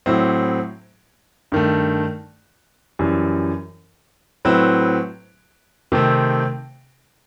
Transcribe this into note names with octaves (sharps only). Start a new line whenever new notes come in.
A2 F#3 C4 E4
G2 D#3 A3
F#2 E3 G3
A2 F#3 C4 E4 B4
C3 D#3 A3 C4